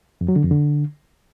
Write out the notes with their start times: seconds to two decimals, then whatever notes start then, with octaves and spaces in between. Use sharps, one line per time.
0.21 F2
0.28 F#3
0.36 D3
0.43 F2
0.51 D3